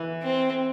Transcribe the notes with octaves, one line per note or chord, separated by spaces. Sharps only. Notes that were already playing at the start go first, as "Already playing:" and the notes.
Already playing: E3
C4